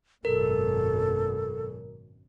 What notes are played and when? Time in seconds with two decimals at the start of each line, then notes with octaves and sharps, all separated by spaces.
0.25 G#1 F#2 B2 A4 A#4